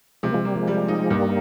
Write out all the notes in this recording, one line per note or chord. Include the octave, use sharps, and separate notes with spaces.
C3 F3 G#3
A#3
F3 G#3
G3 A#3
F3 G#3
G3
D#4
G2 G3 A#3